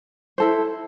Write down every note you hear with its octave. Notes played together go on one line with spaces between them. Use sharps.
E4 A4 C5